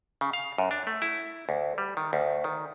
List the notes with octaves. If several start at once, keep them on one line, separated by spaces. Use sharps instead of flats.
C#3
F5
F#2
D4
A3
E4
D2
G3
D#3
D2
D#3